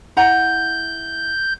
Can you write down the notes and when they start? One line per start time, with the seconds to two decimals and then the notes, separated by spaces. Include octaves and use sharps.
0.17 E4 F#5 A#5 G6